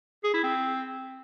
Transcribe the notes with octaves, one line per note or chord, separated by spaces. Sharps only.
G#4
E4
C4